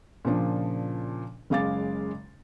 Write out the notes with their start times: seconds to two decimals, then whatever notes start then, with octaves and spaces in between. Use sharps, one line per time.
0.25 A#2 C#3 F3 D4
1.50 F#1 C#3 G#3 F5 D6 A6